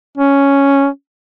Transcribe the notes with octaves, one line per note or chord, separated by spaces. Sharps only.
C#4